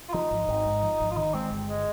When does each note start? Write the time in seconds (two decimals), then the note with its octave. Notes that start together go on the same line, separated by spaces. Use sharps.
0.09 F4
0.14 F3 D#4
0.31 G#1
0.48 G#1
0.66 G#2
0.83 F3
1.00 G#1
1.11 F4
1.17 D#3 D#4
1.34 G#3 C4
1.51 G1
1.69 G#3